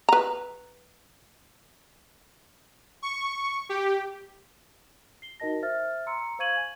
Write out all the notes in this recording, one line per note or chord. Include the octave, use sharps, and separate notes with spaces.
B4 A#5
C#6
G4
C7 G7
D#4 F#4 A#4 D#5 A5 A#6
C5 E5 F6 A6
A#5 C6 E6 C#7
C5 F5 C#6 G#6 D#7 F#7
G#5